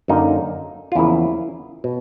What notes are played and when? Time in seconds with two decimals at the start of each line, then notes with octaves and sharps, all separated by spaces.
0.08 F#2 D3 F#3 A#3 D#4
0.92 F4
0.95 E2 C#3 F3 A#3 E4
1.84 B2